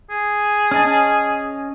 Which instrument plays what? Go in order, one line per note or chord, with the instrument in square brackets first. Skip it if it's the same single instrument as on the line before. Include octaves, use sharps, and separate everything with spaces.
[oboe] G#4
[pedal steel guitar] C#4 D#5 A5